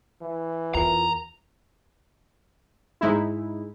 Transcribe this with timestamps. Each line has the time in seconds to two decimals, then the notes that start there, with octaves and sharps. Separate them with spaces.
0.21 E3
0.74 E2 F4 A#4 A#5
3.01 G#2 G#3 D#4 E4